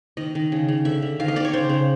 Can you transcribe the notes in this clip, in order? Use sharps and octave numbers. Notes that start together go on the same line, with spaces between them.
D#3 D#5
D#3
C#3
C#3
D3 E5
D3
D#3 F5
D#5
D#3 D5
C#5
C#3 C5
C#3